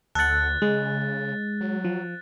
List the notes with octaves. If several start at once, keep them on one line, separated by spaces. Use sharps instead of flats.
D2 A4 F#5 F#6 A6
C#3 G#3
F#3
F3